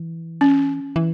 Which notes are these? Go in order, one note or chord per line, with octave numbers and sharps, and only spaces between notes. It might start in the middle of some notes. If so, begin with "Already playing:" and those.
Already playing: E3
C#4
E3